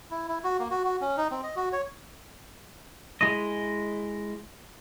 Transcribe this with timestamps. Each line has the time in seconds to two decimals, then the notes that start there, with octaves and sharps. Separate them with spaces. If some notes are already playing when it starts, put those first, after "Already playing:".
0.11 E4
0.28 E4
0.44 F#4
0.59 A#3
0.71 F#4
0.85 F#4
1.01 C#4
1.17 D#4
1.31 C4
1.43 D#5
1.56 F#4
1.72 C#5
3.21 G#3 E4 D#5